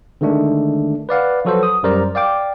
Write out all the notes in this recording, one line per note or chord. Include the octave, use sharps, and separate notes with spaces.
D3 D#3 G#3 A3 D4
B4 D5 F5 F#5
F3 F#3 F#4 A4 B4 C5
D#6
F#2 G3 A#4 C5 D5 A#5
D5 F5 G5 D6